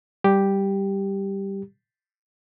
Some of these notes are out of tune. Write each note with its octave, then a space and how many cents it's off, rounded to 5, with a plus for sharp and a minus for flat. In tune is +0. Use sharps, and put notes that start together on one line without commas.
G3 +0 G4 +0